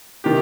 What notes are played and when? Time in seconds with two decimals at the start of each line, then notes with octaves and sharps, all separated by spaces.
0.24 C3 D#3 G4